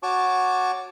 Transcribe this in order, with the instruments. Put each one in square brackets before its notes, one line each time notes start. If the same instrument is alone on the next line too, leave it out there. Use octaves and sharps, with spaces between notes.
[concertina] F#4 C#5 A5 C#6 D6